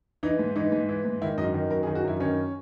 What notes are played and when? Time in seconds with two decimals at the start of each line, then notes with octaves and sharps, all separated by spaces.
0.23 E3 D#4
0.39 G#2
0.56 E3 D#4
0.72 G#2
0.89 E3
1.05 G#2
1.22 D#3 E4
1.38 F#2 D#5
1.54 D#3
1.71 F#2 A#4
1.83 G#4
1.87 D#3
1.95 F#4
2.04 F#2 E4
2.20 D#3 C#4